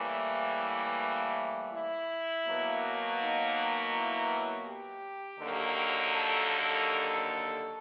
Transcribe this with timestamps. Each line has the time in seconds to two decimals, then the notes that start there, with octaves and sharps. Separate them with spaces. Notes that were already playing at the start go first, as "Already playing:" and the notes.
Already playing: A2 E3 G3 A#3
1.74 E4
2.47 B2 F#3 A#3
3.21 D#4
3.94 E4
4.67 G4
5.39 D#2 D3 F#3 A#3
6.12 A4